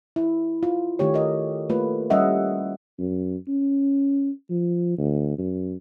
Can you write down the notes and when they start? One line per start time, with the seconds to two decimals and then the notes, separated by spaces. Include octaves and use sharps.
0.16 E4
0.63 F4
0.99 D#3 A3 G4 C#5
1.14 A#4 D#5
1.70 A3 A#3 F4 B4
2.10 G3 C#4 D#5 E5 F#5
2.98 F#2
3.48 C#4
4.50 F3
4.98 D2
5.38 F#2